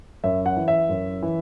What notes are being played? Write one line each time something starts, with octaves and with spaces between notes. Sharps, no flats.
F#2 E5
F#5
E3
E5
F#2
E3